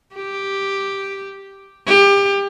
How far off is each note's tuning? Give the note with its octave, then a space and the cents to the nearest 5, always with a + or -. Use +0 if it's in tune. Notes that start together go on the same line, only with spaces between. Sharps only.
G4 +0
G4 +25